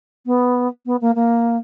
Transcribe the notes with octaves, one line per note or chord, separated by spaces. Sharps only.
B3
B3
A#3
A#3